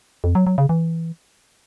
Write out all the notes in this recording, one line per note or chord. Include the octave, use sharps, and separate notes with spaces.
F2
F#3
F#3
C#3
E3